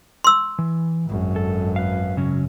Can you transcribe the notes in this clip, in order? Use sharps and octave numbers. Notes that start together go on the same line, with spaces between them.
C6 E6
E3
G#1 F#2
A4
B4 F5
C#3 F#3 C#4